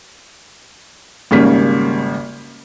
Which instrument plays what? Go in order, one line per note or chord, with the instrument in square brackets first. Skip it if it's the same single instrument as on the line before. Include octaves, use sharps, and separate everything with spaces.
[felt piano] G#1 C#3 G3 A#3 C#4 B6